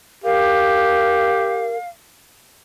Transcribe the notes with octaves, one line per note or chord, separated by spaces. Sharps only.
G4 A#4 F5